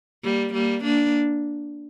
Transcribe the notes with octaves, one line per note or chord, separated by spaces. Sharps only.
G3 A#3
G3 A#3
A#3 D4